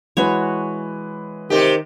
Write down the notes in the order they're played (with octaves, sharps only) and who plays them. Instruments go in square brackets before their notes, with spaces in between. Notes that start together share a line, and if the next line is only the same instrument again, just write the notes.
[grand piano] E3 G#3 B4 [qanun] F#4 C#5
[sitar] C3 G4 [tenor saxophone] D#3